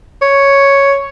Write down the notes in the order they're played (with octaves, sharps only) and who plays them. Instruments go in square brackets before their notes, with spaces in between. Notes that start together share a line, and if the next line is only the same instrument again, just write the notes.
[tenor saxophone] C#5